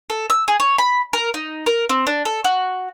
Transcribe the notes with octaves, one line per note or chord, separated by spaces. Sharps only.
A4
E6
G#4
C#5
B5
A#4
D#4
A#4
C4
D4
A4
F#4